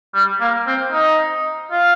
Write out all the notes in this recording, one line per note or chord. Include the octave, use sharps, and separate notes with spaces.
G3
A#3
C4
D#4
F4